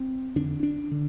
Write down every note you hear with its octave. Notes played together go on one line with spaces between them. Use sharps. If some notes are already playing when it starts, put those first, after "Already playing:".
Already playing: C4
F2 D3 D4
D4
D3